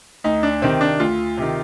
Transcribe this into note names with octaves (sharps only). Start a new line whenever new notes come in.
D2 D#4
D4
C3 D#3 C4
D4
D2 F4
C3 D#3